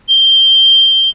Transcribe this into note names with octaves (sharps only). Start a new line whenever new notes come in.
G7